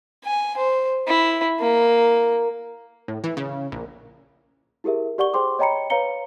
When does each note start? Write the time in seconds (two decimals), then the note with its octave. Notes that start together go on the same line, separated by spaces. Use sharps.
0.25 G#5
0.57 C5
1.07 E4
1.59 A#3
3.08 A2
3.24 E3
3.37 C#3
3.72 A#1
4.84 E4 G4 G#4 A#4 E5
5.18 G4 D5 F#5 C#6 G7
5.34 G#4 C5 G5 C6 D6
5.59 C#5 D#5 G5 A#5 B5 C#7
5.90 B4 C#5 F5 A#5 C#7 G7